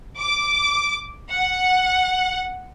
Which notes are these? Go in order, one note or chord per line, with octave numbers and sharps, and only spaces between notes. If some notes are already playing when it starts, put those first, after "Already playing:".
D6
F#5